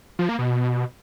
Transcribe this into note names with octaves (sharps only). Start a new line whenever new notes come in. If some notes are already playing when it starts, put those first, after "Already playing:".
F3
A#3
B2